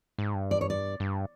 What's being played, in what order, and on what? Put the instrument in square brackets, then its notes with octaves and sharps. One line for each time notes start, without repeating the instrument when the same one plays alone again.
[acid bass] G#2
G2
[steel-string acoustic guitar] D5
C#5
D5
[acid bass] G2